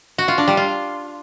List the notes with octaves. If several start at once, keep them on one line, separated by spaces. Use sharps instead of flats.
F#4
F4
D4
G3
F4